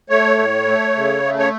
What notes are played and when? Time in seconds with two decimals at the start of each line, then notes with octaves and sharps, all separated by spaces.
0.09 A3 C#5
0.38 A2
0.66 A3
0.96 C#3
1.24 A3
1.39 C#5